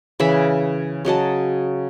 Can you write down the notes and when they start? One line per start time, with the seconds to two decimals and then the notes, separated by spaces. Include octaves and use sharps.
0.20 C#3 E3 E5 B5
1.05 C#3 F#3 D#5 A5